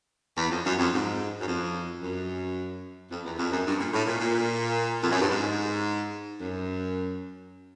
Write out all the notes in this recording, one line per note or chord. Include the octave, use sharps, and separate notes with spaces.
E2
F2
F#2
F2
G#2
F#2
F2
F#2
F2
E2
F2
F#2
G2
A#2
A2
A#2
A#2
F2
F#2
G2
G#2
F#2